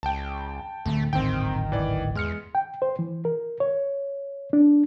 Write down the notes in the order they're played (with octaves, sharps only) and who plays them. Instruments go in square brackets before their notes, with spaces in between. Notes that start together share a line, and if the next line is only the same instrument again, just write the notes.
[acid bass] C#2 [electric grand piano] G5 A5
[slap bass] D1 D2 [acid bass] A3
[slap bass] D1 G#1 A#2 [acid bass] D#3 [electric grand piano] C4 G5
[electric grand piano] E3 D5
[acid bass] E2 [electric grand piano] G#3 F6 C#7
[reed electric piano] G5
C5
E3
A#4
C#5
D4